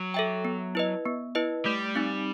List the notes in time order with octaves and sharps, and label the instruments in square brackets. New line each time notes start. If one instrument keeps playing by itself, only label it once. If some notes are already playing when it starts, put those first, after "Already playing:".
Already playing: [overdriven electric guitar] F#3
[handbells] A4 E5 G5
B3
E4 B4 D#5
B3
E4 B4 D#5
[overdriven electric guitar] G3 [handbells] A3
[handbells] C4 D#4